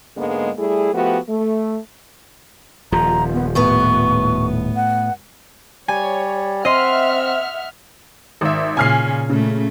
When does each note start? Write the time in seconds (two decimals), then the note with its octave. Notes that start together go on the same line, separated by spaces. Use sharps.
0.17 G#2 D3 G#3 A#3 B3
0.58 G3 A3 E4 G#4
0.93 F3 A3 B3 F#4 G4
1.29 A3
2.92 D#1 F3 A#5
3.33 B3
3.55 A2 B3 B4 C#6
4.76 F#5
5.88 G3 C#5 G#5
6.65 C4 D#5 E5 F#5 C6 F6
8.41 G#1 E5
8.77 A#2 C#3 G#5 F6 C7
9.29 A#2 C#3 A3